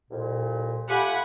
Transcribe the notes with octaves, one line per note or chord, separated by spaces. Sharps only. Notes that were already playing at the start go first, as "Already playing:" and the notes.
C2 F2 A#2
A3 F4 G4 F#5 G#5 B5